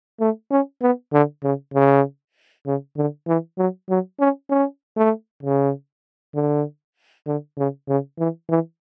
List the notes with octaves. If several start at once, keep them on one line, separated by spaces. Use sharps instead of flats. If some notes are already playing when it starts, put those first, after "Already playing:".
A3
C#4
B3
D3
C#3
C#3
C#3
D3
E3
F#3
F#3
C#4
C#4
A3
C#3
D3
D3
C#3
C#3
E3
E3